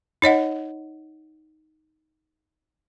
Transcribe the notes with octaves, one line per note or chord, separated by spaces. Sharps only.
D#4 C#5 D#5 F#5